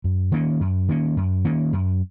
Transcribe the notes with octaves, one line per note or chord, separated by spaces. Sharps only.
F#2
D#3 A#3 C#4
F#2
D#3 A#3 C#4
F#2
D#3 A#3 C#4
F#2